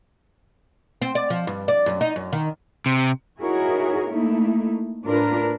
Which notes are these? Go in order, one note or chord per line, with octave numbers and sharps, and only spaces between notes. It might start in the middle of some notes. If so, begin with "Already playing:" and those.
C4
D5
F3
G2
D5
F#2
D#4
F#2
D#3
C3
D#4 E4 F#4 G#4 A#4 C#5
A3 A#3 D#4 E4
A2 D4 F4 A#4 B4